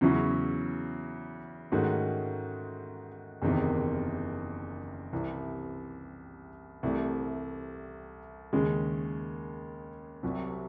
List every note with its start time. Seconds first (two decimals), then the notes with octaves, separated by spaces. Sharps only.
0.01 E2 C#3 F#3 C#4 E4
1.72 G#2 D#3 A3 C#4 F#4
3.42 F#1 E2 C3 D#3
5.13 C2 C3 E3
6.83 C2 C3 E3 A3
8.53 D#2 C#3 G#3
10.23 C2 C3 F#3